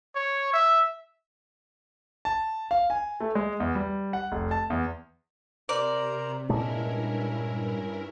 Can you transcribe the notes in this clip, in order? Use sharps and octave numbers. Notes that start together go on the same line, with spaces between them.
C#5
E5
A5
F5
G#5
A3
G#3
E2
G3
F#5
F1
A5
E2
C3 A#4 C5 D5 A#5
G2 A#2 G#3 C#4 D4 E4 A#4